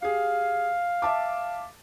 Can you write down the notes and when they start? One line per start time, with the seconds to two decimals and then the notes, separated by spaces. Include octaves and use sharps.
0.02 G4 G#4 F5
1.02 E5 A5 D6